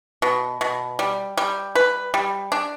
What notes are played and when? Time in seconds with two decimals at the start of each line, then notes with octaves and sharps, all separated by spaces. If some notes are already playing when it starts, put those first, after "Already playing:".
0.22 B2
0.61 B2
0.99 G3
1.37 G3
1.75 B4
2.14 G3
2.52 D4